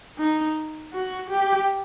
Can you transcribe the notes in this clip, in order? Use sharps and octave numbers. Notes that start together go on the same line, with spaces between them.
D#4
F#4
G4